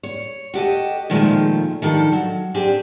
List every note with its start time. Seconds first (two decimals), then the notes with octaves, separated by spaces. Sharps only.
0.03 C#5
0.54 F#4 G4 A4 D#5
1.10 A#2 D#3 F3 G#3 A3
1.82 D#3 F3 D4 G4 A4
2.12 F#3
2.54 C4 D4 G4 G#4